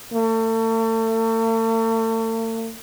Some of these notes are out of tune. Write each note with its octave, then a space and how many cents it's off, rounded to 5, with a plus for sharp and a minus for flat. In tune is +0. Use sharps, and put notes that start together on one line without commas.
A3 +40